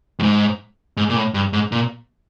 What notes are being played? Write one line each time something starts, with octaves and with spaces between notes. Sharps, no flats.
G2
G#2
G#2
A#2
A2
G2
G#2
A#2